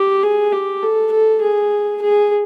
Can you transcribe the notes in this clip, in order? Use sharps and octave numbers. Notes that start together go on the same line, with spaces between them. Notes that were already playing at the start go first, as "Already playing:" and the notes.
Already playing: G4
G#4
G4
A4
A4
G#4
G#4